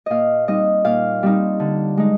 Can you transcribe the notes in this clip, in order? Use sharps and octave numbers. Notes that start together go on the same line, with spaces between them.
A#2 D#5 F5
G3 C4 D#4 D#5
A#2 F5
G3 C4 D#4
D3
G#3 D#4